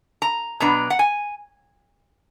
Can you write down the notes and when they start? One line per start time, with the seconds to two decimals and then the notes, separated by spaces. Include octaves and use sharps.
0.22 A#5
0.60 B2 F#3 B3 D4 A#5
0.90 F#5
0.99 G#5